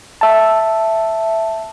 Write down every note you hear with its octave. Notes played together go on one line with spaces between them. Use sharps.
E5 A5